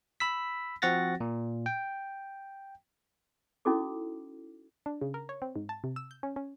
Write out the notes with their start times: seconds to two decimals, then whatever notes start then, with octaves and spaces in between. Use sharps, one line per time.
0.20 B5 E6 B6
0.82 F3 C4 F#4 F#5 A6 A#6
1.20 A#2
1.66 G5
3.65 C#4 D#4 E4 F#4 A4 D6
4.86 D4
5.01 C#3
5.14 A#4
5.29 C#5
5.42 C4
5.56 G#2
5.69 A5
5.84 C3
5.96 E6
6.11 G6
6.23 C#4
6.36 C#4